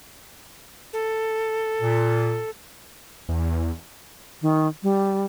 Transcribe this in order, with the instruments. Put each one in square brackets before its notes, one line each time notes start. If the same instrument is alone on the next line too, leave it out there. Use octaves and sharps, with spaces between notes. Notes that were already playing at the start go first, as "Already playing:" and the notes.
[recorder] A4
[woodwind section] A#2
[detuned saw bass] E2
[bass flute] D#3
G3